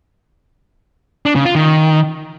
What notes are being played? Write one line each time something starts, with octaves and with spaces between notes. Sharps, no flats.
D4
C#3
F4
D#3